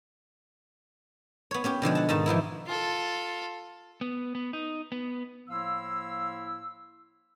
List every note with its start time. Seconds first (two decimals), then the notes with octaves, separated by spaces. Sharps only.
1.51 B3 C#5
1.64 B3 C#4 G4
1.82 B2 D3 F3 G#3
1.95 F#5 A5
2.09 G#2 D#3 D#4 A5
2.26 E3 F3 B3 E4
2.67 F4 A4
4.01 B3
4.35 B3
4.53 D#4
4.92 B3
5.49 A2 F3 A#3 E4 F5 E6